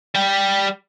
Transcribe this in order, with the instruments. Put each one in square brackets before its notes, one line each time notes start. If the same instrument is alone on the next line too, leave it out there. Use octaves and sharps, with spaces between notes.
[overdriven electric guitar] G3 G5